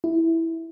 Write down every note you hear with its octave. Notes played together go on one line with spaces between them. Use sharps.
E4